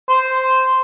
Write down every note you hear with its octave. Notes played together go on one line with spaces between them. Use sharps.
C5